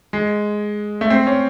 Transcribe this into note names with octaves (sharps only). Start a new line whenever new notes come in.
G#3
A3
C4
C#4